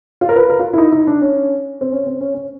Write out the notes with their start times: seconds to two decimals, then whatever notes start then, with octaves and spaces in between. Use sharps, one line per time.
0.21 F4
0.29 A#4
0.36 B4
0.50 A#4
0.59 F4
0.73 E4
0.78 D#4
0.92 D#4
1.07 D4
1.21 C#4
1.81 C4
1.92 C#4
2.06 C4
2.21 C#4
2.34 C#4